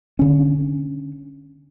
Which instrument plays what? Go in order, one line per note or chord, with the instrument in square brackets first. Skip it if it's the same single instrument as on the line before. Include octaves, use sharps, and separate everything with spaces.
[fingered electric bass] D3 C#4